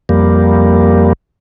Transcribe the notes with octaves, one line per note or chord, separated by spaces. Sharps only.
F2 G3 A#3